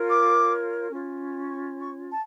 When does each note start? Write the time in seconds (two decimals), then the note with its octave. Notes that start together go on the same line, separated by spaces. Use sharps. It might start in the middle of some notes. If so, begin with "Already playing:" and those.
Already playing: F4 A#4 C#5
0.09 D6
0.90 C#4 F4 C#5
1.50 C#6
1.80 C#6
2.10 A5